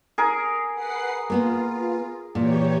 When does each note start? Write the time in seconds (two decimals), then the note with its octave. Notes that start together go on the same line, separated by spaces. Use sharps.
0.18 G#4 A#4
0.74 B4 F#5 C7
1.30 A#3 B3 F4 B4
2.35 A#2 E3 G4 C#5